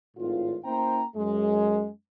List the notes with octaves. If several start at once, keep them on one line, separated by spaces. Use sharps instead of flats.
G#1 A2 F4
A#3 C#4 E4 C5 G5 A#5
F#2 G#3